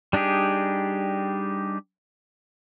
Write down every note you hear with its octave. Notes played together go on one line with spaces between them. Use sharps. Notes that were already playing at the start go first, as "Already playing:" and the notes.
G3 D4 D#4 G4 G#4